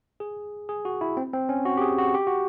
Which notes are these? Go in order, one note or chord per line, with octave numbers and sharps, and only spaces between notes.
G#4
G#4
F#4
E4
C4
C4
C#4
F#4
G4
G#4
F#4
G4
F#4